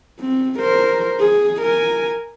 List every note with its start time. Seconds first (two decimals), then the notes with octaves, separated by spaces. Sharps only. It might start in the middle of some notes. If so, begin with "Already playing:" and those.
0.20 C4
0.59 A#4 C5
1.19 G#4
1.61 A#4 G#5